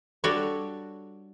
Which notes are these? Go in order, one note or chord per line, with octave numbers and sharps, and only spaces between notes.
G3 D4 F#4 A4 C#5